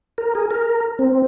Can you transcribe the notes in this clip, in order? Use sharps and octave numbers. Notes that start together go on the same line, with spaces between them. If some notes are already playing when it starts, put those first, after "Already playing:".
A#4
G#4
A#4
C4